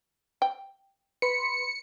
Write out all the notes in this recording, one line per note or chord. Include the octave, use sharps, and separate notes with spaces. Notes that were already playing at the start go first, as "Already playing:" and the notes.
G5
B4 B5 C6 C#7